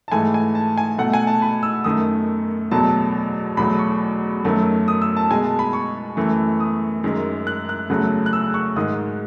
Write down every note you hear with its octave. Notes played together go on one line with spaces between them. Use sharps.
A5
G#2 E3 A3 G#5
G#5
A5
G#5
B2 A3 F#5
G#5
A5
B5
E6
F#2 D#3 A3 D#6
E2 B2 F#3 A3 A5
E2 B2 F#3 A3 B5
C#6
F#2 D#3 F#3 A3
D#6
E6
A5
B2 G#3 G#5
A5
B5
C#6
F#2 E3 A3
D#6
F#2 D#3 G#3
F#6
F#6
E2 C#3 F#3 A3
F#6
E6
C#6
G#2 D#3 G#3 D#6